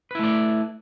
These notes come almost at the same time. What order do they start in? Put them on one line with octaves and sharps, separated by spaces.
B4 E4 A3 D5